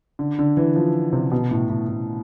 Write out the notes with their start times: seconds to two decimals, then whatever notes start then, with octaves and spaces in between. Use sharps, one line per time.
0.19 D3
0.39 D3
0.57 E3
0.76 F3
1.13 C3
1.31 B2
1.51 A2
1.70 A2
1.88 A2